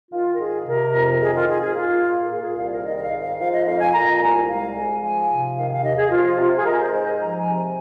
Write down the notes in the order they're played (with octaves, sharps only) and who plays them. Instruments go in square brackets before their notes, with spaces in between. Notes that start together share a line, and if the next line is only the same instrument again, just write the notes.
[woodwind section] D#3 F4
A#4
G#2 G#4
C3 A#4
F2
D#3 G#4
F4
G#2 G#4
G#4
A#3 F4
A#2
A#4
A#2 G#4
G#4
C2 F5
A#4
D#3 D#5
D#5
F5
G#2
F5
F3 F5
D#5
F2 F5
G#5
A#2 A#5
A#5
C2 G#5
G#3 F5
G#2 G#5
F3 G#5
C3
D#3 F5
F5
D#2 D#5
G#4
F3 F4
C3
G#4
G#3 A#4
C5
G#2 C5
G#5
F3 A#5
G#5
C3
G#5